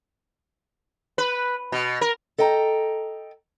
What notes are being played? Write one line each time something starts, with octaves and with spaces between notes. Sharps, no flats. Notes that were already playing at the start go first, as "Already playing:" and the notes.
B4
B2
A#4
A4 D#5 G5 A#5